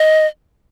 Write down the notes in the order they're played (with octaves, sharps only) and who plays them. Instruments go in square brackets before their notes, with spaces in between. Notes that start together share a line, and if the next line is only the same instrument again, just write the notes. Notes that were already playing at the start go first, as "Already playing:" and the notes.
Already playing: [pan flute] D#5